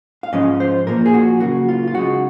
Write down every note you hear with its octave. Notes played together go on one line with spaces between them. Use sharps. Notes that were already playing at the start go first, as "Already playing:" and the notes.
F5
G#2 F3 G#3 C#4 D#5
C5
A#2 F3 A#3 A#4
G#4
F#4
C#3 F#3 A#3 F#4
F4
F4
C#3 G#3 D#4 F#4